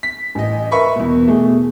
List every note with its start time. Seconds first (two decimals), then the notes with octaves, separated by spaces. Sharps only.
0.03 B6
0.35 A1 D#5
0.71 A#4 B4 E5 B5 C#6
0.96 E2 B2
1.27 B2 A3 G#4